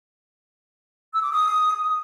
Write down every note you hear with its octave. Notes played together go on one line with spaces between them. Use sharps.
E6
D6
D#6